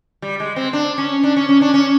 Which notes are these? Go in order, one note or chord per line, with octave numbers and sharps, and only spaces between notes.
G3
G#3
C4
D4
C#4
D4
C#4
C#4
D4
C#4